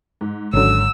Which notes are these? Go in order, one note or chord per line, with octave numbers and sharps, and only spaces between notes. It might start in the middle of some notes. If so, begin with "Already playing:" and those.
G#2
G#1 D3 F#3 C#4 E6